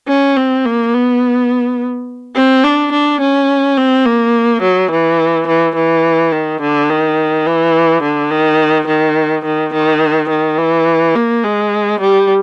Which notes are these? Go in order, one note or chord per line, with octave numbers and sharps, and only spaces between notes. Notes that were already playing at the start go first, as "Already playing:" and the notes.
C#4
C4
A#3
B3
C4
D4
D4
C#4
C4
A#3
F#3
E3
E3
E3
D#3
D3
D#3
E3
D3
D#3
D#3
D#3
D#3
D#3
E3
A#3
G#3
G3